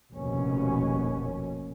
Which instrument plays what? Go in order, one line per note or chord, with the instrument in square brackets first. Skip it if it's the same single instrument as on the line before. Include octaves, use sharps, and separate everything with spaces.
[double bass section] F1 A#1 D#2 B2 C#4